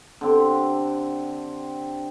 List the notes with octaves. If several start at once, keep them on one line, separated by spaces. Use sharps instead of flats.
D3 C4 G4